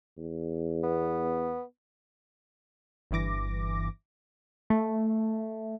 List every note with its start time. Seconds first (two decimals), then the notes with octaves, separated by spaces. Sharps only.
0.17 E2
0.83 B3
3.11 G1 G2 E3 D6 A#6
4.70 A3